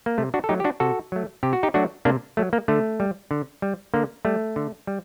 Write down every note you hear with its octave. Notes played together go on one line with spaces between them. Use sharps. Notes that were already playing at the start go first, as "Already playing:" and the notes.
A#3
C3 A3
D4 F#4
A4
F#3 A3 D#4 G4
G4
D4 F#4
C3 F#4 A4
F#3 A3
C3 G4
F#4
D#4 G4
F#3 A3 D4 F#4
C3 A#3 D4
F#3 A3
A#3
D3 A3
G3
D3
G3
D3 A#3
G3 A3
D3
G3